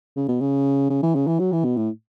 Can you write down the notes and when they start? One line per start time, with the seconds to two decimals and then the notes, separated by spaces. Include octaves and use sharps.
0.16 C#3
0.28 B2
0.41 C#3
0.90 C#3
1.03 E3
1.15 C#3
1.27 E3
1.40 F#3
1.52 E3
1.64 B2
1.77 A2